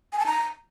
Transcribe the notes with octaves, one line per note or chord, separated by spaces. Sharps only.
G#5
A5
A#5